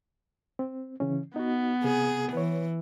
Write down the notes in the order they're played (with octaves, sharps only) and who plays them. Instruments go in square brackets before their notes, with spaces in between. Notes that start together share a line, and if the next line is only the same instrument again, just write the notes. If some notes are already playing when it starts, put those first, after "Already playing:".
[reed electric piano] C4
C#3 E3 C#4
[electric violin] B3 [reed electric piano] D#4 F#4
[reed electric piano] C3 [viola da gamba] G#4
[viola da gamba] E3 [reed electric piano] B4 C#5